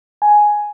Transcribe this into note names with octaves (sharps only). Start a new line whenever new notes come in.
G#5